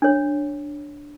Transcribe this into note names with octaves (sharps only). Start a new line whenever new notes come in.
D4 C#5